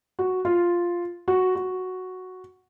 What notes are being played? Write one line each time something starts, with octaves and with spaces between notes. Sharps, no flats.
F#4
F4
F#4
F#4